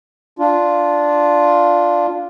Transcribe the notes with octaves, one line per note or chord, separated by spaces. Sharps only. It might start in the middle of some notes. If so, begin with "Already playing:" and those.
D4 F4